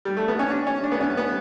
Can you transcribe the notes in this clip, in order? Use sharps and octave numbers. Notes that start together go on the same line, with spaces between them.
G3
A3
B3
C#4
D4
C#4
D4
B3
C#4
B3